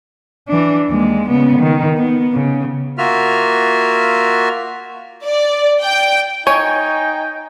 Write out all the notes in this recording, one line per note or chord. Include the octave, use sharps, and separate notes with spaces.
E3 D4
D#2 G#3
C#3 B3
D#3
B3
C#3
A#3 F4 F#4 E5 F6
D5
G5
D#4 C#5 G5 G#5